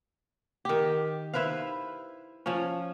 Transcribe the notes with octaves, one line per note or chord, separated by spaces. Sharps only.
D#3 G4
E4 B4 C5 F5
F3 C#4